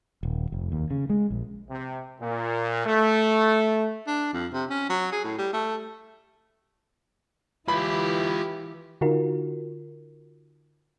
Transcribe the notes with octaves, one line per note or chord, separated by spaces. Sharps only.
D#1
F1
D#2
C#3
G#3
A#1
C3
A#2
A3
D4
F2
C3
C#4
F#3
G#4
A2
G3
A3
E3 E4 F4 G4 B4 B5
D3 D#4 F4 F#4 A#4